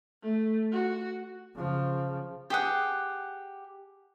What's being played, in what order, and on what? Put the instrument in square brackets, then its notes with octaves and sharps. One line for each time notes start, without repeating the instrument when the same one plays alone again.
[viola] A3
F#4
[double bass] C#3 F3
[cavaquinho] G4 G#4 F#5